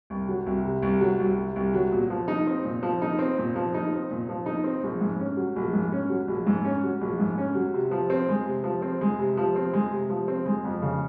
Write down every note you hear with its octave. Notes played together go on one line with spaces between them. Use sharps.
C2
F#3
C2
C3
C2
F#3
C2
C3
C2
F#3
A#2
F3
D#4
C4
A#2
F3
D#4
C4
A#2
F3
D#4
C4
A#2
F3
D#4
C4
A#1
G#2
C#4
F#3
A#1
G#2
C#4
F#3
A#1
G#2
C#4
F#3
A#1
G#2
C#4
F#3
C3
F3
C4
G#3
C3
F3
C4
G#3
C3
F3
C4
G#3
C3
F3
C4
G#3
F2
C#3